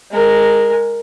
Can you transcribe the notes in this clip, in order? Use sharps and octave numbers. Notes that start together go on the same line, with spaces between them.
G#3 A#4